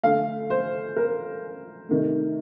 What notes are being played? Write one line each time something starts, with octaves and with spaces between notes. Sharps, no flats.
D3 A3 F5
C5
A#4
C3 D#3 A3